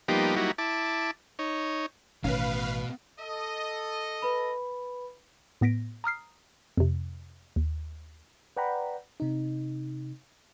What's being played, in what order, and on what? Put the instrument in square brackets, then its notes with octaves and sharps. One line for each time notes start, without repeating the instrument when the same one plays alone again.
[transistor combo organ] F3 G3 A#3 B3 D#4 G4
F#3 G3 A#3 D#4 E4 F#4
E4 A5 D6
D#4 C#5
[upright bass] A1 [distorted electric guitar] B2 [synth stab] D#3 C#4 [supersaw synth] B4 F5
[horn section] A4 D#5
[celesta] B4 B5
[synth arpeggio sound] A2 B3 A#6 B6 D7
A#5 D#6 F6 C7
F2 C3
D#2
[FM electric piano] B4 D5 F#5 G5 A#5 B5
C3 D#4